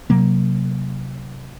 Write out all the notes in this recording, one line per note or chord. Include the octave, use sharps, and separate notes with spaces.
C3 F#3 A#3